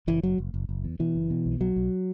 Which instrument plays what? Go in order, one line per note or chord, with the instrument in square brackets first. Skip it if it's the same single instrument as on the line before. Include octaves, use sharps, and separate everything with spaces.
[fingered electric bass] F#1 E3
F#1 F#3
F#1
F#1
F#1
E2
B2 E3
F#1
B2
B1
B1 F#3
B1